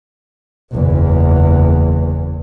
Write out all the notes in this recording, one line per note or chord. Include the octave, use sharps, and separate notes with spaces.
F#1 E2